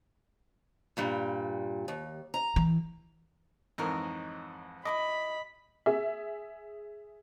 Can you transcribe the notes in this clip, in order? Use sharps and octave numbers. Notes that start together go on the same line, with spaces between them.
G2 A#2 G3
D#2
A#5
E3
F2 G#2 E3 A#4 C#5 D#5
E4 A#4 D#5 B5 D6
G#4 E5